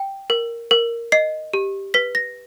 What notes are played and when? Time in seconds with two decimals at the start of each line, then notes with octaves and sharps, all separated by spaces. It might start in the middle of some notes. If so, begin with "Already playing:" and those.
Already playing: G5
0.30 A#4
0.71 A#4
1.12 D#5 C7
1.53 G4
1.94 B4 B6
2.15 A#6